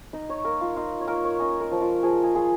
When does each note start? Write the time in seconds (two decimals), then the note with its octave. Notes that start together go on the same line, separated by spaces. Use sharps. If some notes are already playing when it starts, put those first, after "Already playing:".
0.13 D#4 D#5
0.29 C#5
0.45 A#3 A#4
0.61 F4
0.76 D#4 F4
1.01 C#5
1.08 A#3 A#4
1.24 C#5
1.40 C#4 D#5
1.61 A#4
1.71 F3
1.81 F4
2.03 F3 G#4
2.24 G#4
2.34 F4 G#4